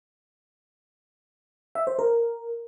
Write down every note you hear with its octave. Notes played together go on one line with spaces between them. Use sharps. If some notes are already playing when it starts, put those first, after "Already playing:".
E5
C5
A#4